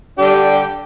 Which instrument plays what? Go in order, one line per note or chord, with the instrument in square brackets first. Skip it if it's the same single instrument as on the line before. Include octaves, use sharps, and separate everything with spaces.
[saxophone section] D3 G3 D4 G4